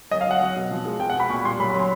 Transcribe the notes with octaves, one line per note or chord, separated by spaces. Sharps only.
F#3 D#5
F5
F#3 F#5
F#3
B2
F3
G#3
B2 G5
F#5
B2 B5
A#2 C#6
G3 C6
F#3 B5
B5
F#3
C6